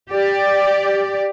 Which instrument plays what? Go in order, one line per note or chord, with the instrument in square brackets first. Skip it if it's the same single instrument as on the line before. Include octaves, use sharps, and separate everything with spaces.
[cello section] G4 D5